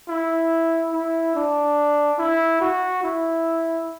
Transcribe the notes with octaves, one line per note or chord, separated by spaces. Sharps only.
E4
E4
D4
E4
F#4
E4